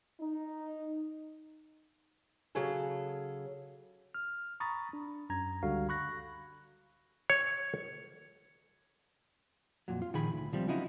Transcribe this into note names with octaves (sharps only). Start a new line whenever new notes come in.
D#4
C#3 F#3 G#4 A4
F6
A#5 B5 C#6 D#6 A6
D4
F#2 A#5 G#6
C#2 D3 G3 F#4 F5
B5 C#6 F#6 A#6
C#5
F2 A#2 F#3
F4
A#2 D#3 F3 G#4 B5
D2
C#2 F3 G3 C4
C#3 F3 F#3 D#4 E4